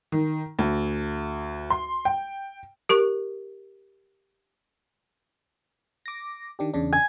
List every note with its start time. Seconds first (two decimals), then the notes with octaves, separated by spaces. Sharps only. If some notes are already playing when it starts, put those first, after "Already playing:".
0.12 D#3
0.59 D2
1.70 C6
2.05 G5
2.89 G4 A#4 C#6
6.06 D6 A#6
6.59 D#3 D4 G4
6.74 E2 C#3 D4
6.93 G#5